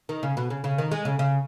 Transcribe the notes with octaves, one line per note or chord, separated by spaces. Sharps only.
D#3
C#3
B2
C#3
C#3
D#3
G#3
C#3
C#3